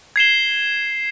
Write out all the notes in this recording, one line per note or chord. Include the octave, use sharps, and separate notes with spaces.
G#6 C7 E7 G7